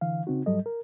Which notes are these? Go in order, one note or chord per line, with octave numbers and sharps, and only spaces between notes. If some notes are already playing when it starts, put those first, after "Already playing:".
D3 E3 F5
C#3 C4 D#4 F#4
G#2 F#3 G3 A4 D#5
A#4